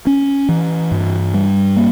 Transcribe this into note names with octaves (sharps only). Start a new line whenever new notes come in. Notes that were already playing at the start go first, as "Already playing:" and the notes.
C#4
E3
G2
G3
A#3